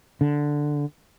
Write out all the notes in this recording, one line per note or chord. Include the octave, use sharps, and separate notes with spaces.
D3